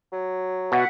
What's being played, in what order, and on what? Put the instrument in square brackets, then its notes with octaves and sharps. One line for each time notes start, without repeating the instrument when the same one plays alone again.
[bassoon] F#3
[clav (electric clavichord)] B2 [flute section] E5 F#5